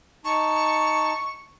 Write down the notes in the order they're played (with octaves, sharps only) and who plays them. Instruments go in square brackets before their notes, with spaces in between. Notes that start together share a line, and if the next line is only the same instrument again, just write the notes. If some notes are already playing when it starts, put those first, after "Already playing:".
[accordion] D#4 A5 [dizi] C#6